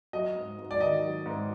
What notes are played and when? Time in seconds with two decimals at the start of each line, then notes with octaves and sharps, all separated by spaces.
0.13 F#3 D#5
0.35 G#2
0.58 G#2
0.71 D5
0.80 D#3 D#5
1.03 F#3
1.26 G#2